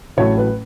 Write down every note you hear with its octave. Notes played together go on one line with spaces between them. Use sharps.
A1 A2 F#3 A3 C#5
B4